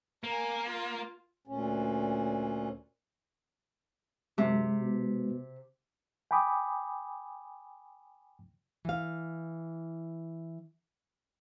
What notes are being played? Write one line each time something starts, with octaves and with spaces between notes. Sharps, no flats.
A#3 A#4 G#5
F4 C6
D2 A#2 C#4
F#2 C3 G#3
B2
G5 G#5 B5 D6 D#6
E3 F5